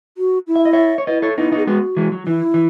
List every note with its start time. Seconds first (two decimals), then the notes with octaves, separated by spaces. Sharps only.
0.18 F#4
0.47 E4
0.56 E5
0.65 D#5
0.73 C#5 E5
0.98 C#5
1.07 E4 B4 D#5
1.22 A4 C#5
1.37 B3 D#4 E4
1.52 B3 D#4
1.58 G#4
1.67 G#3 B3 F#4
1.97 E3 G#3
2.12 F#3
2.27 E3 E4
2.54 E3